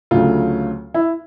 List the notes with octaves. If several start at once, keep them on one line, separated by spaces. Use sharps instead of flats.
D2 C#3 F#3 A3 F4
E4